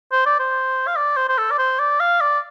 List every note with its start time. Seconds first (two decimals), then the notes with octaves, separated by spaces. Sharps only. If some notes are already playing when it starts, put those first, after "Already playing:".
0.12 C5
0.26 D5
0.40 C5
0.87 F5
0.96 D5
1.17 C5
1.29 C5
1.38 A4
1.51 D5
1.59 C5
1.79 D5
2.00 F5
2.21 D5